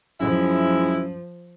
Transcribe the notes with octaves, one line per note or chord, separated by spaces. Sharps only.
F#2 F3 G#3 E4